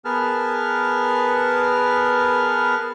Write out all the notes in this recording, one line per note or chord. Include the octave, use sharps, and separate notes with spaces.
B3 G#4 A#4 B4 A5 F6